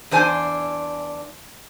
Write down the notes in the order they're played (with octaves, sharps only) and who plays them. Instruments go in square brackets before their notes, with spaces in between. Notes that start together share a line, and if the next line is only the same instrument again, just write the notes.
[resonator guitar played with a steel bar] E2 D4 C5 G#5